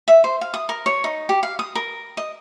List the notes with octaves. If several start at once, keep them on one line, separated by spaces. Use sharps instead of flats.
E5
C5
F5
D#6
A#4
C#5
D#4
G4
F5
D#6
A#4
D#5